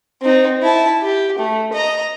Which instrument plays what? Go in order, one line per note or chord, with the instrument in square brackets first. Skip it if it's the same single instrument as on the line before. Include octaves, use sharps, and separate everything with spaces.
[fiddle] C4 D#4
E4 A5
G4
A3
D#5 A#5